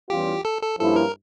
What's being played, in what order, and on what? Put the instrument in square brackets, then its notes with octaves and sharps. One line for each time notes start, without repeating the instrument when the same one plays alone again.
[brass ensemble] E2 E3 G3 C#4 F4 [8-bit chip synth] G4
[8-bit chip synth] A4
A4
[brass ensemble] G2 F3 A#3 C#4 E4 [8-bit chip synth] A4
[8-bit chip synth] A#4